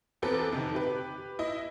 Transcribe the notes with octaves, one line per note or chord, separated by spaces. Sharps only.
E2 C4 A4 B4 A#5
F2 C3 D#3
G4 B4
E4 D#5